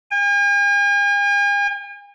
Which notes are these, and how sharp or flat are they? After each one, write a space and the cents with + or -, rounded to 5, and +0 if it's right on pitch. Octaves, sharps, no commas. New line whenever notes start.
G#5 -45